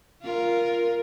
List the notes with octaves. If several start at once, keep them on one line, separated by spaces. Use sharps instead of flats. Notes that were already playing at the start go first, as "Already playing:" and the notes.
F4 A#4